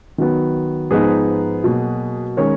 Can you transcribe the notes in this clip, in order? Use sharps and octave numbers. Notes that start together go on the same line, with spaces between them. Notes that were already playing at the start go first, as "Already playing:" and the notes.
D#3 F#3 B3
G#2 F3 B3 D#4 G#4 B4
B2 F#3 A#3
D#3 G#3 C#4 A#4 C#5